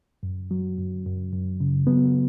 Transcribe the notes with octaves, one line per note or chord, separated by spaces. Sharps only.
F#2
F#3
F#2
F#2
F#2
C#3
F#3 B3